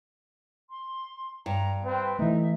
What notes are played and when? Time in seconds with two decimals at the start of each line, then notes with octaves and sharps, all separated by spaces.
0.70 C6
1.46 G2 A#5
1.85 C4 B4
2.19 E3 A3 D#4 E5